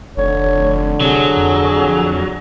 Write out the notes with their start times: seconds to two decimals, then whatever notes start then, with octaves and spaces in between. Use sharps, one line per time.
0.17 F1 D3 C#5
1.00 C3 F#3 G#4
1.37 F2